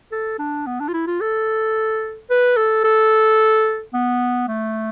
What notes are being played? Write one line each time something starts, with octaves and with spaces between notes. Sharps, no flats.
A4
D4
B3
D4
F4
E4
F4
A4
B4
A4
A4
B3
A3